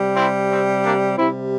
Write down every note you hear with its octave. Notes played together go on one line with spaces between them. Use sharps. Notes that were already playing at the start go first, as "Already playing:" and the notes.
Already playing: C3 G3
C4 E4
C4
A#3 D4
C3 G3 C4 E4